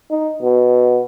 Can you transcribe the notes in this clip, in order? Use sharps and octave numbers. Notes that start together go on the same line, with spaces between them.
D#4
B2